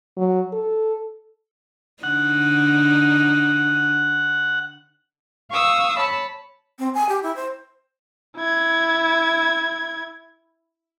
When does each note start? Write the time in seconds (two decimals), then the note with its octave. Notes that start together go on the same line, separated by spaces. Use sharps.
0.17 F#3
0.52 A4
2.03 D3 D4 D#4 F#5
5.50 F5 C#6 D#6 E6
5.99 C#5 A5 B5
6.79 C4
6.94 G#5
7.09 G4
7.23 E4
7.36 C5
8.37 E4 G#6